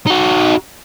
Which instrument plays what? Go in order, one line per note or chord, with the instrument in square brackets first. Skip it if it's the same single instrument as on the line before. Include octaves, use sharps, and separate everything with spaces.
[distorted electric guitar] D#4 F#4